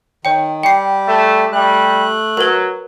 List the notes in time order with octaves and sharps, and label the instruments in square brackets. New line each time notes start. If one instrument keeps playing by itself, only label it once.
[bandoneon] D#3 [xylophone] C#5 G5
[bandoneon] G3 G4 [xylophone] G5 C7
[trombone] A3
[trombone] G3 [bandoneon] A3 F#6
[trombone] F#3 [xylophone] A#4 B4